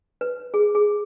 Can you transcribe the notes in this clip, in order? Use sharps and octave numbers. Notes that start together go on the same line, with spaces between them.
B4
G#4
G#4